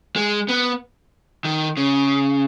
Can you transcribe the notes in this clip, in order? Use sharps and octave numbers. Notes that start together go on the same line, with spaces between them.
G#3
B3
D#3
C#3